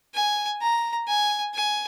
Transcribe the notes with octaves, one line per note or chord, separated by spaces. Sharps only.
G#5
A#5
G#5
G#5